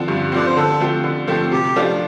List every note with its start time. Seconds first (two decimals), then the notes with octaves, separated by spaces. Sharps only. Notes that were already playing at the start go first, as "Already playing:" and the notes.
Already playing: D3 F3 C4
0.08 G2
0.32 D3 F3 C4 D5
0.46 C5
0.56 D3 A4
0.80 F3 A3 C4 G4
1.04 D3
1.28 F3 A3 C4 G4
1.52 C3 G4
1.76 F3 A3 D4 F4